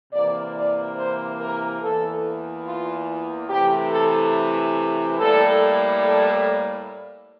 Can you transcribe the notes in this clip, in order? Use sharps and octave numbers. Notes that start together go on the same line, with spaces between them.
C3 E3 A#3 D5
D5
C5
A#4
E2 E3 A#3 A4
F4
C3 E3 A3 G4
A4
A2 G3 A#3 A4
A4